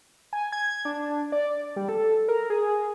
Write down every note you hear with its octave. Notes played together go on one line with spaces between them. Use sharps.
G#5
G#6
D4
D5
G3
A4
A#4
G#4